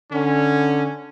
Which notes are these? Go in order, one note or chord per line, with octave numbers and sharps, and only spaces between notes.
D3 C#4